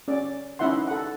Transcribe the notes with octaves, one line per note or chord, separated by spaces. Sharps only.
C#4 D5
C#4 D#4 E4 E5 F#5 C6
A4 F#5